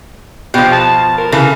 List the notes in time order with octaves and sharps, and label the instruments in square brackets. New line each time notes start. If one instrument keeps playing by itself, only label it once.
[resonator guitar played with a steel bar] B2 F3 [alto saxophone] G4
[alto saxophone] A5
A#4
[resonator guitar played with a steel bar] C#3 E3 A4